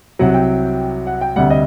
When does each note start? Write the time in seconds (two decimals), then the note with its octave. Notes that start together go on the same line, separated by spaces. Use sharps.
0.19 C2 C3 F#3 F#5
0.34 G5
1.07 F#5
1.21 G5
1.36 D2 C3 G3 F#5
1.50 D#5